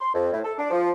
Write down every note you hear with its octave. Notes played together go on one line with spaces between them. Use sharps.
C6
F2
A2
A4
D4
F3